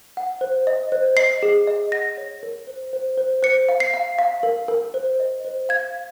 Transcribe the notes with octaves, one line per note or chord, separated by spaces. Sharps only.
F#5
C5
D#5
C5
D#5 C7
G#4
D#5
F#5 A#6
C#5
A#4
C5
C5
C5
C5 C#7
F5
C7
F5
F5
A#4
A#4
C5
D#5
C5
F5 G#6
F5